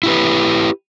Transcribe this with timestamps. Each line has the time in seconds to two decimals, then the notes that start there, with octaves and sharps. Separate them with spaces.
0.03 E4 G4 B4